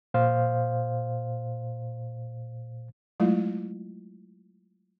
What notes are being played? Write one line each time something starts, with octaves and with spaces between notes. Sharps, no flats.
A#2 C5 F5
F#3 G#3 A3 E4 F4